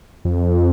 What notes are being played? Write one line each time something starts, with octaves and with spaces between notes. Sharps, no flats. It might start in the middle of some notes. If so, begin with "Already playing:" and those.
F2